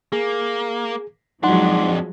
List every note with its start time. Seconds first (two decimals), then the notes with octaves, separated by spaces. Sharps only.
0.12 A#3 G#4
1.43 F2 F3 F#3 G#3 D4 D#4 F#5 C6